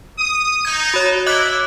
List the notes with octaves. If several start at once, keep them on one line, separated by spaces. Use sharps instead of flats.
D#6
D#4 G#6
F#4 C#5
E4 D#5 D6 F#6